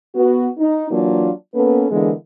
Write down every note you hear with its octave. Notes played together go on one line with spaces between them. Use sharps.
B3 F#4
D#4
E3 F#3 A#3 D4 F4
A#3 B3 C#4 A4 B4
D3 E3 G#3 A#3 B3